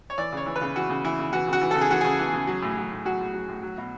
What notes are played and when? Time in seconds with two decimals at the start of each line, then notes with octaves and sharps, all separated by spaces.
0.10 C#5
0.18 E3 D5
0.32 C#3 C#5
0.46 E3
0.56 B4
0.61 C#3
0.75 E3 F#4
0.89 C#3
1.04 E3 E4
1.19 C#3
1.33 E3 F#4
1.47 C#3
1.53 F#4
1.61 E3
1.71 C#3 A4
1.81 G#4
1.90 E3 F#4
2.01 C#3 G#4
2.19 E3
2.34 C#3
2.47 F#3
2.62 A2
2.77 F#3
2.91 A2
3.05 F#3 F#4
3.20 A2
3.34 F#3
3.49 A2
3.62 F#3
3.78 B2